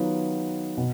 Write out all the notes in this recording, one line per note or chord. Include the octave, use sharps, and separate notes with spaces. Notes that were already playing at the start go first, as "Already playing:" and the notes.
Already playing: D#3 F#3 B3 F4
B2